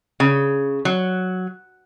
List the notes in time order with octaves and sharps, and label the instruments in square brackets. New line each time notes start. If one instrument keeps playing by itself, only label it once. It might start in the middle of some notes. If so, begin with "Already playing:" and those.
[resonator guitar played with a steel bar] C#3
F#3